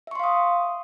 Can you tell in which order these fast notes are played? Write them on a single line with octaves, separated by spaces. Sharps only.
E5 C#6 C6 F5 D#6